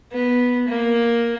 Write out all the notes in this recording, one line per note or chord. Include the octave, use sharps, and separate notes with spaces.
B3
A#3